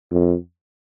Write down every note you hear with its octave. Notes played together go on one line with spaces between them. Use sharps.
F2